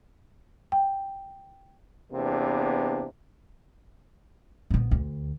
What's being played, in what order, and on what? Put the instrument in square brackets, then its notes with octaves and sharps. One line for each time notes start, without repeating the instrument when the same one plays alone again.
[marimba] G5
[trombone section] E2 C3 A#3 B3 D4
[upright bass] A#1 B3
D2